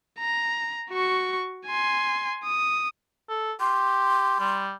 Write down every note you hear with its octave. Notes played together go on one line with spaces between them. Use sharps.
A#5
F#4 C#6
G#5 C6
D#6
A4
G4 C6
G3